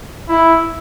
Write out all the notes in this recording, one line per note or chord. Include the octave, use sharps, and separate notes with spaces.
E4